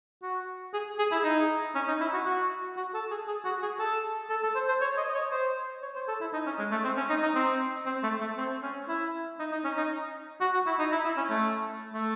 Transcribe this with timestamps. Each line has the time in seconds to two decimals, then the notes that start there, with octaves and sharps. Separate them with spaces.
0.23 F#4
0.73 G#4
0.99 G#4
1.12 E4
1.24 D#4
1.75 C#4
1.88 D#4
2.01 E4
2.13 F#4
2.26 F#4
2.77 F#4
2.94 A4
3.11 G#4
3.28 G#4
3.45 F#4
3.62 G#4
3.79 A4
4.30 A4
4.43 A4
4.55 C5
4.68 C5
4.81 C#5
4.97 D#5
5.09 D#5
5.15 C#5
5.31 C5
5.82 C#5
5.95 C5
6.08 A4
6.21 E4
6.33 D#4
6.46 C#4
6.59 G#3
6.71 A3
6.85 C4
6.97 C#4
7.09 D#4
7.22 D#4
7.35 C4
7.86 C4
8.03 A3
8.21 A3
8.37 C4
8.63 C#4
8.89 E4
9.39 D#4
9.52 D#4
9.64 C#4
9.77 D#4
10.41 F#4
10.54 F#4
10.66 E4
10.79 D#4
10.92 E4
11.05 E4
11.17 C#4
11.30 A3
11.94 A3